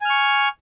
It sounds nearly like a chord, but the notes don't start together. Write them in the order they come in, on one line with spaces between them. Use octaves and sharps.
G#5 F6 C#6